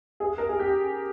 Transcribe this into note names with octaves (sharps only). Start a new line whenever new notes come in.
G#4
A#4
G#4
G4